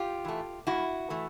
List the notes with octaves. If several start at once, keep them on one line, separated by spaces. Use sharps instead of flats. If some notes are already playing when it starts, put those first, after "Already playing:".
Already playing: F4 G4
E3 A3
G2 E4 F#4
E3 A3